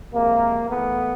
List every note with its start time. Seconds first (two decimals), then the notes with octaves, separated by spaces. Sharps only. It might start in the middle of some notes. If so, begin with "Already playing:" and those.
0.13 C3 F3 G#3 A#3
0.69 A2 E3 A3 B3